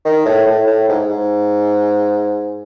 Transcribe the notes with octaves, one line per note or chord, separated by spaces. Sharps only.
D#3
A2
A2
A2
G#2
G#2